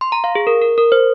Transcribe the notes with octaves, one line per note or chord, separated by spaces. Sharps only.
C6
A#5
F5
G#4
A#4
A#4
A#4
C5